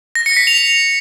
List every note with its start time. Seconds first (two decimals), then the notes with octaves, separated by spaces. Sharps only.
0.15 A#6
0.26 C#7
0.37 B6
0.47 F7
0.58 F7